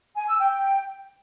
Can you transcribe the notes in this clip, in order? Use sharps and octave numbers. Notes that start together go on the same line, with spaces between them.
G#5
E6
G5